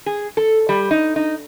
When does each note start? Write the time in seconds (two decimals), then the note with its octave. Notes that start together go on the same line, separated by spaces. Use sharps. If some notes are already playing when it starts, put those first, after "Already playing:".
0.06 G#4
0.37 A4
0.69 G3
0.91 D#4
1.16 D#4